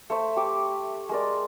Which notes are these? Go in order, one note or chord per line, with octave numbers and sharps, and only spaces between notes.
A3 C5 E5
G4 D6
G#3 A#4 D5